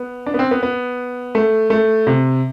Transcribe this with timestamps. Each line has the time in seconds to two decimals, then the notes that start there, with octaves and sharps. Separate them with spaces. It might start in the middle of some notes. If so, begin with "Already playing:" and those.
Already playing: B3
0.26 D4
0.34 B3
0.39 C4
0.51 B3
0.63 B3
1.35 A3
1.70 A3
2.07 C3